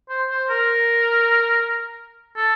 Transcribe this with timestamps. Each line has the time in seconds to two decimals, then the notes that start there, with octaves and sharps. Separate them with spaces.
0.09 C5
0.29 C5
0.50 A#4
2.36 A4